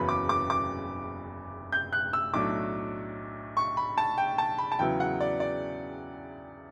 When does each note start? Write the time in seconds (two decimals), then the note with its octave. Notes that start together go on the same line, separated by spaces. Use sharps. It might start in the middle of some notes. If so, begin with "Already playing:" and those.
Already playing: F#1 E2 C#3 F#3 B3 B5
0.09 D6
0.29 D6
0.50 D6
1.72 G6
1.93 F#6
2.13 E6
2.33 B1 A2 F#3 A3 D4 D6
3.57 C#6
3.77 B5
3.98 A5
4.18 G5
4.38 A5
4.58 B5
4.72 A5
4.79 E2 C#3 F#3 B3 E4 G5
5.00 F#5
5.21 D5
5.40 D5